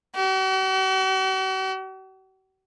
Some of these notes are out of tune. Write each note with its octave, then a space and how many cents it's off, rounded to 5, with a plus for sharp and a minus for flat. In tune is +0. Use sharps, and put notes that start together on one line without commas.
F#4 +45